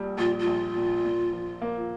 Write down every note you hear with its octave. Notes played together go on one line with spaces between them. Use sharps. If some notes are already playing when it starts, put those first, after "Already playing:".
Already playing: A#1 A#2 G3
A#1 F4
F4
A#1
A#2
A#2
F3
A#3